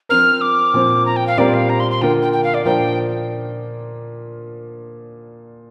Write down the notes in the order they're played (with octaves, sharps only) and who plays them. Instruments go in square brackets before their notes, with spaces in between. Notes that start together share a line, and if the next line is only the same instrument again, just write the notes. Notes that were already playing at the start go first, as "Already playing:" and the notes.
[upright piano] F3 C4 A#4 [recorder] F6
[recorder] D6
[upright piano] A#2 F3 C4
[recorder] A#5
G5
F5
[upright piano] A#2 G3 C4 A#4 [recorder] D5
[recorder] F5
A#5
C6
C6
[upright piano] D3 A#3 F4 A#4 [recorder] G5
[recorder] G5
G5
F5
D5
[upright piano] A#2 F3 D4 A#4 [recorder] G5